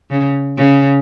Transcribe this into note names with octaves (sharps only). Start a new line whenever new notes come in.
C#3
C#3